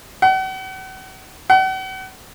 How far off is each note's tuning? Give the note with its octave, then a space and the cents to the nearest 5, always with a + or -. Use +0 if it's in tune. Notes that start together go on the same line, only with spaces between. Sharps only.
F#5 +40
F#5 +40